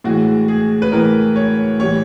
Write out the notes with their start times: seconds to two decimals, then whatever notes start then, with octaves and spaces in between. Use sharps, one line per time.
0.04 A2 E3 G#3 F#4
0.48 G#4
0.82 B4
0.92 A2 E3 G#3 A#4
1.36 C#5
1.79 A2 E3 G3 C#5